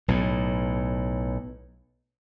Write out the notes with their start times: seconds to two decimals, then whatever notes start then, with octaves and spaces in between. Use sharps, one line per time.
0.08 B1 A2